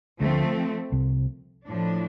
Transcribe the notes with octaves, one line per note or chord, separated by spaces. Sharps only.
D2 D3 F3 A3 C4
C2 C3
A2 F3 D4